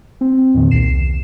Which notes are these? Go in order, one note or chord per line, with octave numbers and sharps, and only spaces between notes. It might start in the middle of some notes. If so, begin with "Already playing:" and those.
C4
E2 A#2 D#3
C2 C7 E7